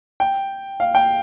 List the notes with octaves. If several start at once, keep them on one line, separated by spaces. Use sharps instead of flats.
G5
F5
G5